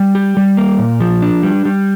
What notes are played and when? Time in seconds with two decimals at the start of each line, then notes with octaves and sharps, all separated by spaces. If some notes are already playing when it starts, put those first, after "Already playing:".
Already playing: G3
0.15 G4
0.37 G3
0.57 A#3
0.79 A#2
1.00 F3
1.22 D4
1.43 G3
1.65 G3